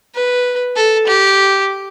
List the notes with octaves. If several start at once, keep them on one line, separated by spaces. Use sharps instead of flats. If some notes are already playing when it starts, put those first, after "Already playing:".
B4
A4
G4